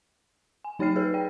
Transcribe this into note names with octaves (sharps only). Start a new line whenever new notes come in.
G#5
F#3 D#4 C#5 G5 F6 C7
G#4 B4 C#5
D5 G5